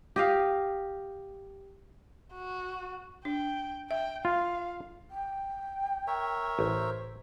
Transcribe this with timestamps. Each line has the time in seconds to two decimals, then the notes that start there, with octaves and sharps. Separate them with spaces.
0.16 G4 D#5 F5
2.34 F#4
3.25 D4 G5
3.91 E5 G5
4.25 F4 F5
5.11 G5
6.07 A#4 C#5 E5
6.59 A1 C5